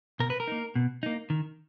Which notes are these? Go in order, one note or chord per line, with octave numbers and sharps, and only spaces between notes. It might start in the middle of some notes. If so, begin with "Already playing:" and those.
B2 A#4
B4
A#4
A#3 D#4
B2
A#3 D#4
D#3